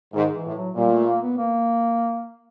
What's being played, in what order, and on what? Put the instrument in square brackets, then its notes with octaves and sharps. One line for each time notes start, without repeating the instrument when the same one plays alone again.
[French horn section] G#2 [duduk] D#3
[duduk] E3
[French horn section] A2
[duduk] F#3
[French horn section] A#2 [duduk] G3
[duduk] A3
A#3
B3
A#3